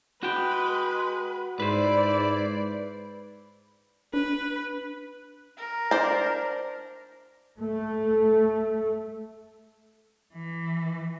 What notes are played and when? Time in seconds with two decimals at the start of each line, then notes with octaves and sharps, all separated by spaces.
0.23 G#3 F#4 B4 G5
1.60 G#2 E4 B4 C5 D5
4.14 D4 B4
5.57 A#4
5.91 D4 C5
7.60 A3
10.33 E3